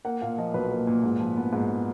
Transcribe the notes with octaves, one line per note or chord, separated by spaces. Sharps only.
A#3 F#5
A#2 F5
F3 D#5
B1 B4
A#3
A#2
G#2
F3
B3
G#2